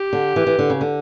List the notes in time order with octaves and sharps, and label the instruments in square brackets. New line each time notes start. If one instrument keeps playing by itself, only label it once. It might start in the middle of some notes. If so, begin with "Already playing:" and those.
Already playing: [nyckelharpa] G4
[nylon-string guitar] D3
E3
E3
D3
C#3
D3